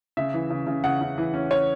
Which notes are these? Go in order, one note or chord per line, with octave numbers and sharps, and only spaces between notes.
C#3 E5
E3
C#3
C#3
C#3 F#5
C#3
E3
C#4
C#4 C#5